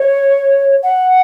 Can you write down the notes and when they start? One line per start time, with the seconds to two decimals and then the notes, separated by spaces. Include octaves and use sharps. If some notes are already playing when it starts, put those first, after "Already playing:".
Already playing: C#5
0.83 F#5